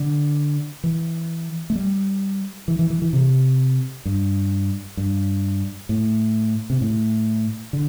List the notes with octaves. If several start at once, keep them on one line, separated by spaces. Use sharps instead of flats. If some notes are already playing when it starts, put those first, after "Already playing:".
Already playing: D3
E3
A3
G3
E3
E3
E3
E3
C3
G2
G2
A2
C3
A2
D3